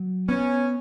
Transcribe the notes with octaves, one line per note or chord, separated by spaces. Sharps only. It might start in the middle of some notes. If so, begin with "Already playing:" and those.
Already playing: F#3
B3 C#4